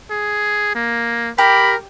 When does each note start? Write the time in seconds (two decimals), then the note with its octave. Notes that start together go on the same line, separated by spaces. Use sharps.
0.10 G#4
0.75 A#3
1.38 G4 A#4 B5